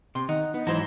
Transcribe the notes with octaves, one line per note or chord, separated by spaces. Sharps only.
C3 C6
D#3 D#4 F#5
B3 D#4
G#2 E3 F#3 E4 C5 A#5